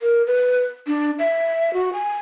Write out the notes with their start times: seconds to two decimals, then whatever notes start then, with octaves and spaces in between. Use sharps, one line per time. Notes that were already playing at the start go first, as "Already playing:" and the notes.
0.01 A#4
0.27 B4
0.87 D4
1.19 E5
1.73 F#4
1.93 G#5